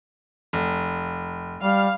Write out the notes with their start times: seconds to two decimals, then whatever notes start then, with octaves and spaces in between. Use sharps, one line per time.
0.53 F1
1.61 G3 F5